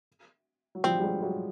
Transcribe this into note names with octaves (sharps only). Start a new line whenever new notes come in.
F#3
F3 G3 C4
G3
F#3 G#3
F#3 G#3